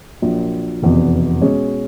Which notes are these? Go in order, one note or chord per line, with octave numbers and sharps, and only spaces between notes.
A#1 A#2 F#3
F1 E2 B2
B2 G#3 C#4